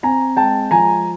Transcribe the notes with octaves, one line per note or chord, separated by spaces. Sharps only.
C4 G#5 A#5
G#3 G5 A5
F3 G#5 A#5